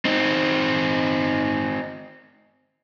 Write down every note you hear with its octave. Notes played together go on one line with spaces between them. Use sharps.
C4 D#4